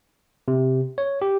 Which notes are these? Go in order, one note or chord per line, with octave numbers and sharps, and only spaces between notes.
C3
C#5
G4